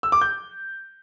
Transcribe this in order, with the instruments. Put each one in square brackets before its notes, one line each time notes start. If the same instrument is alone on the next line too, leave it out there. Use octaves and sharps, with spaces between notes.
[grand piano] E6
D6
G6